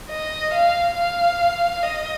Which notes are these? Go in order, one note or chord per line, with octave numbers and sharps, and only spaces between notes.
D#5
F5
F5
D#5